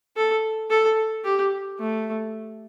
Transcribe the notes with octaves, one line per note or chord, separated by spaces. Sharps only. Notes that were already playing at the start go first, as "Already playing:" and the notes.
A4
A4
G4
A3